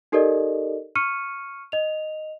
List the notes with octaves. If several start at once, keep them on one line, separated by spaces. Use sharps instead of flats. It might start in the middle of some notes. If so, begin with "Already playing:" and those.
D#4 G4 A4 A#4 D5 D#5
C#6 F6 C#7 D#7
D#5 F7